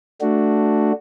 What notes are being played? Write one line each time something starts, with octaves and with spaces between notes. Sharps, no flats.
A3 D4 F#4